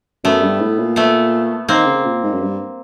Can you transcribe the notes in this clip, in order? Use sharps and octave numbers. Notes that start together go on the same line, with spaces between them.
F#2 A3 B3
G2
A2
A#2
A3 B3
D#3 A#3 C4
C#3
A#2
G#2
F#2
G2